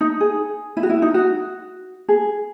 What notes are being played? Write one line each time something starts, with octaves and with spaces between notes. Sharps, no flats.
D#4
G#4
E4
F#4
E4
D#4
F#4
G#4